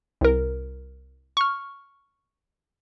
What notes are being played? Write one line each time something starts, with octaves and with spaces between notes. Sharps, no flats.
C2 A#4
C#6 F6